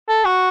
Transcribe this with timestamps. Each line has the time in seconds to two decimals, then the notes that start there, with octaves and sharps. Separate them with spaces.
0.09 A4
0.25 F#4